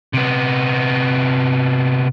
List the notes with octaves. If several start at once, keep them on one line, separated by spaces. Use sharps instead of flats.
C3 B3